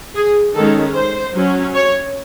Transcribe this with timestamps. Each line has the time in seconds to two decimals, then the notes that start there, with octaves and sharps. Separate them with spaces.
0.15 G#4
0.55 D#3 G#3 C#4 A4
0.95 C5
1.35 F#3 C#4
1.74 C#5